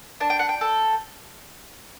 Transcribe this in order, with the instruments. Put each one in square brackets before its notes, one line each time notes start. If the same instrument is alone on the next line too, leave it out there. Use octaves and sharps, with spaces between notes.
[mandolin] D4 A5
G5
F#5
G5
A4